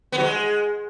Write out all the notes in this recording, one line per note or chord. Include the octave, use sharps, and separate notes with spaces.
B3
F#3
G#3